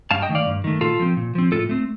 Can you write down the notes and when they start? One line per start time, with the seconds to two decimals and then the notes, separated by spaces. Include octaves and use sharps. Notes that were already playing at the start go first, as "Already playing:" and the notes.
0.11 G2 F5 A5
0.22 D#5 G5
0.29 D#3 A3
0.35 D5 F5
0.46 G2
0.64 D#3 A3
0.81 A#2 F4 A4
0.99 F3 C4
1.17 A#2
1.35 F3 C4
1.52 A2 F4 A4
1.69 A3 C4